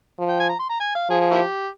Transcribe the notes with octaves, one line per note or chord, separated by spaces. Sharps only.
F3
G5
G#5
A#5
C6
A#5
G#5
F5
F3 G#4
G#4
A#3 E4 G4